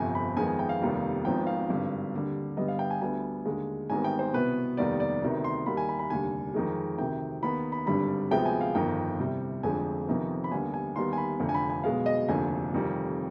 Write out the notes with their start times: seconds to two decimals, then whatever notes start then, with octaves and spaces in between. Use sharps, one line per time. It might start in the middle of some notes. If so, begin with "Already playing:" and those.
Already playing: G1 F2 C3 G#5
0.15 B5
0.37 F2 D#3 G#3 B3 G#5
0.48 G#5
0.59 G5
0.69 F5
0.81 F1 D#2 D#3 G3 B3
1.25 G#1 G#2 F3 B3 G5
1.47 F5
1.69 G#1 G2 D3
2.13 D#2 D3 G3
2.57 G2 D3 G3 B3 D#5
2.68 F5
2.79 G5
2.91 G#5
3.01 D2 D3 G3 B3 G#5
3.45 D#2 D3 G#3
3.90 G#1 G#2 D#3 G3 B3 G#5
4.04 G5
4.19 C5
4.34 C2 B2 B3 B4
4.77 F1 D#2 D#3 G3 B3 D5
5.00 D5
5.22 D2 C3 D#3 B3
5.44 C6
5.66 D#2 D#3 G3 B5
5.77 G#5
5.89 B5
5.99 B5
6.10 F1 D#2 D3 G3 G#5
6.54 F2 D#3 G#3
6.98 D2 C3 D#3 G5
7.43 D#2 D#3 B3 B5
7.72 B5
7.86 G#1 G2 D3 G3 B5
8.31 D2 C3 F3 G#3 B3 G5
8.46 G#5
8.61 F5
8.75 G1 F2 D#3 G5
9.19 C2 C3 G3
9.63 F1 F2 D3 F3 G#3 G#5
10.07 F2 C3 D#3 B3
10.44 B5
10.52 D#2 D3 G3 B3 G#5
10.74 G#5
10.96 D#2 D#3 G3 B3 C6
11.13 G#5
11.18 B5
11.40 F1 F2 D3
11.49 G#5
11.54 B5
11.70 G#5
11.84 B1 B2 G#3 B3 F5
12.06 D#5
12.28 F1 D#2 D3 F3 G#5
12.73 F1 F2 D#3 G3